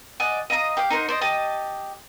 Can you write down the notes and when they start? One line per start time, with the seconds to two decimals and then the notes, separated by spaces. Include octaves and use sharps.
0.20 D5 D#5 F#5 G#5
0.50 D#5 F5 A#5 D#6
0.77 G4 F5 G5
0.90 D#4 A#4 C5 F#5
1.09 C5 D5 D#5
1.21 G4 D#5 A5 D#6